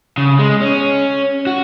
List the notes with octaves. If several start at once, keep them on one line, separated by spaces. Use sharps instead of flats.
C#3
G#3
C#4
F#4